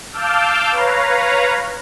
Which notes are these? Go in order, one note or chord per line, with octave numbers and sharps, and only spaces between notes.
F5 A5 D6 E6 F6 G6
B4 C#5 F5 A#5